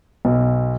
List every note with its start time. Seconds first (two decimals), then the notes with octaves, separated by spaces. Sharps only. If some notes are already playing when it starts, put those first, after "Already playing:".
0.25 B1